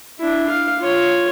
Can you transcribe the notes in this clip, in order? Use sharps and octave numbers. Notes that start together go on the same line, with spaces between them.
D4 E4
F5
F4 C#5